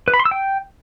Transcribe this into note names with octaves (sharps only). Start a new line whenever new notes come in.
B4
B5
C6
E6
G5